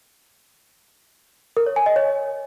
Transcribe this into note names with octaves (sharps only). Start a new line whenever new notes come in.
A#4
C#5
G#5
D#5
C#5